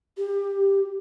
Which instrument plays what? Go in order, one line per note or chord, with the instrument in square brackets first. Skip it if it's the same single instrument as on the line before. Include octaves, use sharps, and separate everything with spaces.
[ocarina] G4